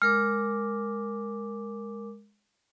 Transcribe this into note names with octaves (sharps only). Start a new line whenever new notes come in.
G#3 A#4 D6 F6